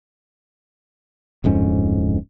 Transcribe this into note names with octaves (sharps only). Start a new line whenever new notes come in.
D1 F2 G#2 C#4